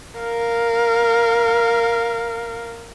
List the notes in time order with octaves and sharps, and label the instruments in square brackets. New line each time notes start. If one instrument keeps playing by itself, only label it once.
[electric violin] A#4 F5